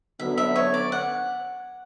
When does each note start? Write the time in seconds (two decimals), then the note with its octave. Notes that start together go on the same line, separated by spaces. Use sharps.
0.20 D3 F#3 B3 E5
0.37 E5
0.56 C#5
0.74 D5
0.92 F#5